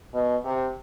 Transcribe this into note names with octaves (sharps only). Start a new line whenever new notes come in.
B2
C3